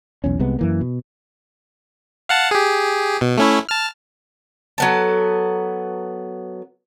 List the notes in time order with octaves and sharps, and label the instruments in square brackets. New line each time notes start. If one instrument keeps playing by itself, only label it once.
[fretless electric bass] B1 E2 C#4
C2 C3 G#3 B3
F#2 E3 A#3
B2
[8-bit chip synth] F5 F#5 A5
G4 G#4
B2
A3 C#4 E4
A5 F6
[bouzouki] F#3 B3 A4